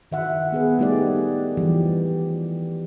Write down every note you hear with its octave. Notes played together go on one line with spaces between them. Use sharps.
D#3 E5 F#5
B3 G#4 B4
G3 A3 D#4 G4 G#4 D5
E3 F3 G3 G4